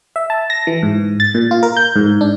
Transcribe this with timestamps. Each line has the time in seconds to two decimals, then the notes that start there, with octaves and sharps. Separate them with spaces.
0.16 E5
0.30 A5
0.50 A#6
0.67 E3
0.83 G#2
1.20 A6
1.34 A#2
1.51 F4
1.63 A#4
1.77 G6
1.96 G#2
2.21 D4